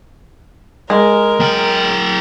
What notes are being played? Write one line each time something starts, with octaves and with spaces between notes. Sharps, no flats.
G#3 A#4
F#3 G5